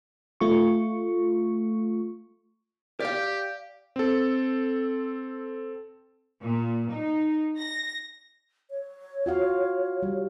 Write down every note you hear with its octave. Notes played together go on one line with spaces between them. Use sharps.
A3 F4 C#6
G4 D5 F5
C4 A4
A#2
D#4
A#6
C#5
F4 F#4 F5
G3